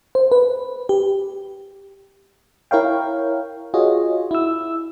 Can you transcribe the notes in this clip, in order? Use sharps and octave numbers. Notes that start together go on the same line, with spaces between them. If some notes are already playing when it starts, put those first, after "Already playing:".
C5
B4
G4
E4 A#4 C#5 F5 G5
F4 F#4 G#4 C#5 D#5
E4 E6